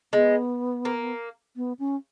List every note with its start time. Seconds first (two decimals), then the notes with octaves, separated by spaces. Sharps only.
0.13 G#3 B3
0.85 A#3
1.56 B3
1.79 C#4